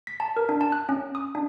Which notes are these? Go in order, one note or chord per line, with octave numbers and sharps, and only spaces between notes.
B6
A5
A#4
D4
A5
F#6
C#4
D#6
D4